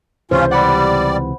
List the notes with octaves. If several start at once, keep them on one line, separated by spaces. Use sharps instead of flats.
C#2 G2 C3 E3 C#4 F4 C5
G3 D5 F#5 B5